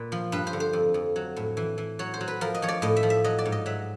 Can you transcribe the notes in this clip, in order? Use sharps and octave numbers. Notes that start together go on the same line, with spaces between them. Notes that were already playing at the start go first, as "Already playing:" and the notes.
Already playing: A#2 B4
F3
G2 B4
C5
D3
C5
F2
F2
F#3
A2
E3
E3
F#3 C#5
C5
F#3
B4
F3 A#4
D#5
F3 C#5
D5
A2 D#5
E5
F3
E5
F#3 D#5
D5
G#2
D#5
F#3 E5